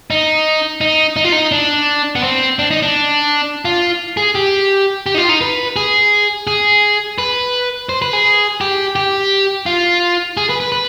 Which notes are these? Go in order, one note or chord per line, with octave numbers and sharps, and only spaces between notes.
D#4
D#4
D#4
F4
D#4
D4
B3
C4
D4
D#4
D4
F4
G#4
G4
G4
D#4
F4
D#4
B4
G#4
G#4
B4
C5
B4
G#4
G4
G4
F4
G#4
B4
B4
B4